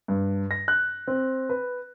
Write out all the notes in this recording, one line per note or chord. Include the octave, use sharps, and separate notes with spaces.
G2
A#6
F#6
C4
B4